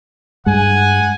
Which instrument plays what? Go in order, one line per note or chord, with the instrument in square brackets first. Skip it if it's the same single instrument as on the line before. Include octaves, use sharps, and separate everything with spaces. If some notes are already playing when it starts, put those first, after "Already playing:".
[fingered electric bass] G2 G#3 [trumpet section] F#5 G#5